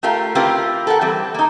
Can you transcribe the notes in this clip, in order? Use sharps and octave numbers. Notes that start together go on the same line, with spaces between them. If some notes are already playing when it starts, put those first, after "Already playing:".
A3 F4 G4 A#4 F5
C4 E4 F4 G4 A#4 B4
A4 A#4 F#5
E3 G3 C4
A#3 D#4